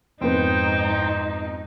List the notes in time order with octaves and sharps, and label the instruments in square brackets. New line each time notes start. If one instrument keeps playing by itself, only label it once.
[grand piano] F2 B3 [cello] G#2 D#4 [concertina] C5 G5